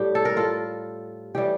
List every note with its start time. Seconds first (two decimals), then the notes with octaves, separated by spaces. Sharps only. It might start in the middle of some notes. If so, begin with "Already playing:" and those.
Already playing: A2 G3 G4
0.15 A4
0.25 A#4
0.37 F4 A4
1.35 A2 E3 G3 G4